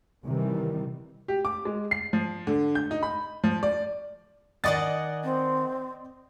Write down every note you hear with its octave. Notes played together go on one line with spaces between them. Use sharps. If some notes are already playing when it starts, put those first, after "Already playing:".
C3 D#3 E3 G3
G4
D6
G#3
C7
F3
D3
G6
D#4
B5
F3
D5
D#3 D5 D#5 F#5 G#5 A6
C4